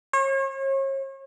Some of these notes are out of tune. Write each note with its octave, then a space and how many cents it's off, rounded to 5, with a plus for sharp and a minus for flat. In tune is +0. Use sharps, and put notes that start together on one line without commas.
C#5 -40